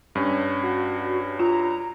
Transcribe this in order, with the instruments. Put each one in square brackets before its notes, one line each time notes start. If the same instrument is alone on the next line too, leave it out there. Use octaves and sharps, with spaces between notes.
[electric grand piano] G2 C#4
[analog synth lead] F#4
[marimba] F4 [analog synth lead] A#5